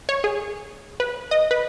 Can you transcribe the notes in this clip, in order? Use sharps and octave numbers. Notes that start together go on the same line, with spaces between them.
C#5
G#4
B4
D#5
B4